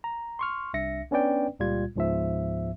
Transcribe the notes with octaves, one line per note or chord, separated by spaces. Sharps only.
A#5
C6 C#6 F6
C2 D4 E5 A#6 C#7
B3 C#4 D4 B4 D5 G5
C#2 A#2 G3 F4 G#6
C#2 G#2 F3 B3 E5